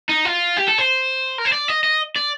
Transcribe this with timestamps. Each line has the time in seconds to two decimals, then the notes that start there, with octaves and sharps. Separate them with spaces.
0.09 D#4
0.25 F4
0.57 G4
0.68 A4
0.78 C5
1.38 A#4
1.45 C5
1.52 D5
1.68 D#5
1.84 D#5
2.16 D5